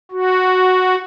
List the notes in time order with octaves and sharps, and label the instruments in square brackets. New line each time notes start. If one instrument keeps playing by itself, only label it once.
[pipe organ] F#4